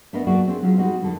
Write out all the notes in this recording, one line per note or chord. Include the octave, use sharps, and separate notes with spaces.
A3 B3 D4 A#4 B4 D#5
F#3 A3 A#3 F#4 G#4 D5
C4 D4 G#4
F#3 G#3 C#4 F4
G3 C4 D#4 F#4 D#5
F2 D3 D#3 A4